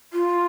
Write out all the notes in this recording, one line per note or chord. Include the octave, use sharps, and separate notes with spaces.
F4